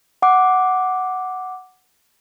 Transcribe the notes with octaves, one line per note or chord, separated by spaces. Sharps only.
F#5 D6